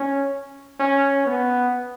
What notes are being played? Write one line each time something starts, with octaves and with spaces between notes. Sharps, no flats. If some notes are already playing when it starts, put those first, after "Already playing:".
Already playing: C#4
C#4
B3